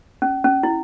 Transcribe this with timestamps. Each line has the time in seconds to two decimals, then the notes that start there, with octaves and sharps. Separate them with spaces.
0.22 C#4
0.44 C#4
0.63 E4